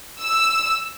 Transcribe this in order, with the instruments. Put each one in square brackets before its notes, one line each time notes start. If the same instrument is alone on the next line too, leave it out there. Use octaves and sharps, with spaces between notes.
[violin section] E6